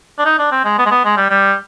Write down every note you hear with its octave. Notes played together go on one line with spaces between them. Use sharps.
D4
D#4
D4
C4
G#3
B3
G#3
B3
G#3
G3
G3